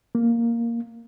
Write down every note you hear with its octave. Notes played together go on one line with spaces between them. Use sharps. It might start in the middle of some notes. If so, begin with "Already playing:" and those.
A#3